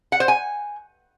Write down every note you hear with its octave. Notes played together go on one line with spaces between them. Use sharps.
F#5
C5
G#5